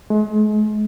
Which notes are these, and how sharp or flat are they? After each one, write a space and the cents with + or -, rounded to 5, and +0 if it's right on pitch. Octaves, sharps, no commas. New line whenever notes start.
G#3 +40